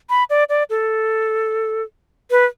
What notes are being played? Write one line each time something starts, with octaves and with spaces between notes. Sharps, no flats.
B5
D5
D5
A4
B4